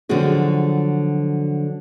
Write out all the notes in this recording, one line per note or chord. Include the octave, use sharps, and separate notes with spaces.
D3 F3 F#3 C4 F#4 G#4